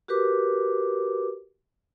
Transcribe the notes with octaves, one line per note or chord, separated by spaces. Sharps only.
F#4 G4 A#4 B4 D6